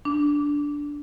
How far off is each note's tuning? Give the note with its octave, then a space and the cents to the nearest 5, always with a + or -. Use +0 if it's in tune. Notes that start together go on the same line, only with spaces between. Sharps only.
D4 -10